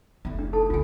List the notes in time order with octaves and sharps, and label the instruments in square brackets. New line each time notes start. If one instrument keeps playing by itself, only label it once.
[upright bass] F1 E4
[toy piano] D4
D#4 A4 A5
[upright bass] C2 C#3 [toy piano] F4 G#5